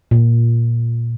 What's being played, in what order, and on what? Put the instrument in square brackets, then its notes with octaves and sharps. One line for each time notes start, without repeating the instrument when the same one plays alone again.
[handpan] A#2